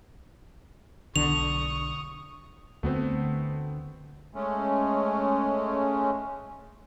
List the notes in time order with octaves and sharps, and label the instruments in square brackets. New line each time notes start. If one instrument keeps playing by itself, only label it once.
[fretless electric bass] B1 D3 [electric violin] C#6 D#6 [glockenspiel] F7
[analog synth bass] D2 [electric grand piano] A3 B3 C4
[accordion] G#3 A3 C#4